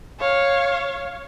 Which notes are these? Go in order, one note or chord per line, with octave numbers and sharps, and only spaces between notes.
C#5 F5